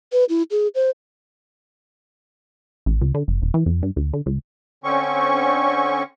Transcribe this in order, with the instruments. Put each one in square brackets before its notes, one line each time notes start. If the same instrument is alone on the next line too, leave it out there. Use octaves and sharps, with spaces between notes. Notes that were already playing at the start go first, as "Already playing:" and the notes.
[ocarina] B4
E4
G#4
C5
[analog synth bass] A1
C#2
D3
F#1
E1
E3
F2
G2
D2
D3
C#2
[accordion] D3 C4 C#4 C#6